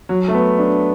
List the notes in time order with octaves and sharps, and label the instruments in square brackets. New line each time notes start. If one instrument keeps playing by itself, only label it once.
[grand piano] F#3
A3
B3
D4